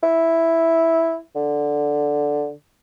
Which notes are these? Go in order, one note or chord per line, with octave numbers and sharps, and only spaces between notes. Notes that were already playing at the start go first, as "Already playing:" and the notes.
E4
D3